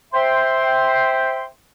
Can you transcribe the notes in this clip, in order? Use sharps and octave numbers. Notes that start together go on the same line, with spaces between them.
C5 E5 G5 C6